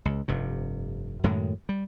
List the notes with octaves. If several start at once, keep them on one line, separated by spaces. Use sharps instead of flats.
C#2
F1 G2 C3
F#2 A2 D#3 G#3
G3